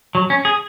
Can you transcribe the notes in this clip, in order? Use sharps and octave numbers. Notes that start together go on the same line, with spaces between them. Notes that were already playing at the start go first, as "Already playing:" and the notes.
F#3
C#4
G#4